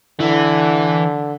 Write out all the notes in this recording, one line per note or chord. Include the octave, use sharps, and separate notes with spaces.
D3 E3